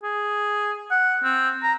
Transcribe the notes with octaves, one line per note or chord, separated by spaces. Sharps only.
G#4
F#5
C4
A#5